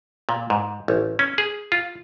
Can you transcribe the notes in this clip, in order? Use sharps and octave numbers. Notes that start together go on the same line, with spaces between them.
A#2
G#2
A1
C#4
G#4
F4